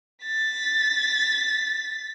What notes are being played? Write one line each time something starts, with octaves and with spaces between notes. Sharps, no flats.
A6 B6